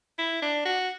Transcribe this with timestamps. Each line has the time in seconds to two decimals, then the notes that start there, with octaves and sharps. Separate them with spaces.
0.18 E4
0.42 D4
0.65 F#4